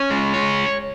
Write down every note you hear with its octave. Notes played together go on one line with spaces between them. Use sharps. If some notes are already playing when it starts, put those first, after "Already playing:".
Already playing: C#4
G#3
C#5